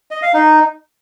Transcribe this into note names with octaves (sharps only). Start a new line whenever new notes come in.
D#5
F5
D#4